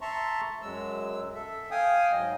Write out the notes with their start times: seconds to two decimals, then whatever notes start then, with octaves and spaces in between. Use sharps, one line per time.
0.01 E5 A5 A#5 C6 C#6
0.62 F#2 F#3 G#3 E6
1.35 A4 E5
1.71 F5 G5 G#5 D#6
2.12 G#2 F#3 D#5